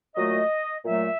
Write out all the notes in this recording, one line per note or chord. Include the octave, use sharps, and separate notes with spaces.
A#2 F#3 A3 D#5
A#2 F#3 A3 E5